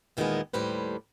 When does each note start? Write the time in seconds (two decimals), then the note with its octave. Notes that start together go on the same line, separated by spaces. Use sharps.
0.17 D#2 A#2 D#3 E3 G#3 B3
0.53 D#2 A2 G3 B4 C5